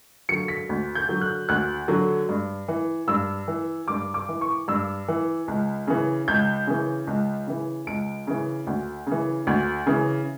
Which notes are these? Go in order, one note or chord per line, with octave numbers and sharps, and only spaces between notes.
D3 F#3 C#7
B6
D2
G6
D3 F#3
F#6
D2 F#6
D3 F#3
G2
E3
G2 E6
E3
G2 D6
D6
E3
C#6
G2 E6
E3
C#2
C#3 E3
C#2 G6
C#3 E3
C#2
C#3 E3
C#2 D7
C#3 E3
D2
C#3 E3
D2
C#3 E3